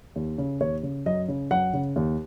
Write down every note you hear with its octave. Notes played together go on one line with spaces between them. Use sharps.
D#2
C#3
D#2 C#5
C#3
F#2 D#5
C#3
F#2 F#5
C#3
D#2